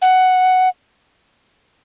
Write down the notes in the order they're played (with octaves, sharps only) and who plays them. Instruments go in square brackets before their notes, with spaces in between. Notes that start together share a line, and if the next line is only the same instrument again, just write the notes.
[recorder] F#5